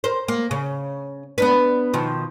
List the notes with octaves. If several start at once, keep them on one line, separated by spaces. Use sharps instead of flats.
A#4 C5
A#3
C#3
B3 D4 B4
B2 D#3 F3